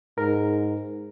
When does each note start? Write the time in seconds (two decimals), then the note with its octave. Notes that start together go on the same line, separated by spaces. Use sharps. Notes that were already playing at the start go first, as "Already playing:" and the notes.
0.18 G#2 A#4